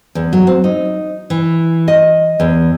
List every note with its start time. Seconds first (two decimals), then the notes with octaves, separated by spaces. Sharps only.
0.15 E2
0.33 F#3
0.47 C4
0.64 D#4
1.30 E3
1.88 D#5
2.40 E2